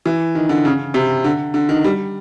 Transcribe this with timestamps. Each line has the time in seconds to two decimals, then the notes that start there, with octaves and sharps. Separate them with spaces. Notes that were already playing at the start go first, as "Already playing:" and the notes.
0.06 E3
0.35 D#3
0.49 D3
0.65 C#3
0.94 C3
1.24 D3
1.54 D3
1.69 D#3
1.84 G3